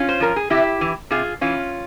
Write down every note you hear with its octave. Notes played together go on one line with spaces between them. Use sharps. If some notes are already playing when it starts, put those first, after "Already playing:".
Already playing: C#4 F4
C5
F3 A#4
G#4
C3 E4 G4
E3
C3 F4 G#4
E3 C#4 F4